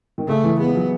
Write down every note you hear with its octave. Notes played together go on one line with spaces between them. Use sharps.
D#3
C#3 A3
E3
G#3 B3
F#3